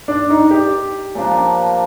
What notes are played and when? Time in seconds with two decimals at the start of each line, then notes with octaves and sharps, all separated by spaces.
0.08 D4
0.30 D#4
0.51 G4
1.15 A#2 F3 A#3 D4